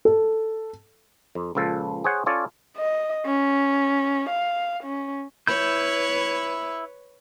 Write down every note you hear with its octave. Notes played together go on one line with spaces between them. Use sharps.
A4
F2
C#2 A#2 F3 A4
G#4 C5 C#5 F#5
C#4 F4 A4 C#5 D5
D#5
C#4
F5
C#4
E4 B4 C#5 G6